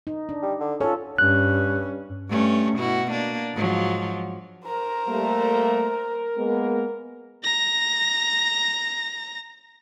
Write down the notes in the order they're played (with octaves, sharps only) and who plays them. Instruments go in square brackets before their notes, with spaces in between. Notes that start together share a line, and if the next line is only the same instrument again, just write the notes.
[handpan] D#4
D4
[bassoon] G3
D3
[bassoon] C#4 [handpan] F4 A4
[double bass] G2 C#4 [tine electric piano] F#6
[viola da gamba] G2 A3 C#4
B2 E4 F#4
A#3 D4
G#2 F3 F#3
[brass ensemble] A#4 [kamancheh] C5 A#5
[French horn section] G3 A3 A#3
G#3 A#3 B3
[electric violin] A#5 A#6